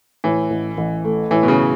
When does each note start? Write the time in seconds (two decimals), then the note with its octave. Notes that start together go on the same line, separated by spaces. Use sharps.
0.24 A2 E3
0.50 A1
0.78 A1
1.05 A3
1.31 A2 E3
1.43 B2
1.48 C#3